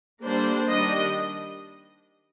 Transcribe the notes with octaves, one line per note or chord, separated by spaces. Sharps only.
D3 G3 A#3 D4 C5
D#3 G3 D4 D#5